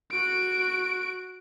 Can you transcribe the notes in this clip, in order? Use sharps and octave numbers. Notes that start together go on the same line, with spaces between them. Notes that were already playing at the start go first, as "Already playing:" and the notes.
F#4 D7